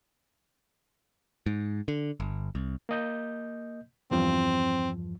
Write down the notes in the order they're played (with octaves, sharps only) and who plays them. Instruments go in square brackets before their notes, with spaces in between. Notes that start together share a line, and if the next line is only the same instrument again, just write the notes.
[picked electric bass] G#2
D3
G1
C2
[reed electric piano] A#3 D#5 G6
[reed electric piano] E2 G2 F3 [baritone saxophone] C4